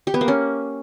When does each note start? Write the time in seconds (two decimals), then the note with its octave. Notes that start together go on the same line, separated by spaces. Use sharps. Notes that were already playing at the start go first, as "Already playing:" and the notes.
0.07 G4
0.14 B3
0.21 A#3
0.28 C#4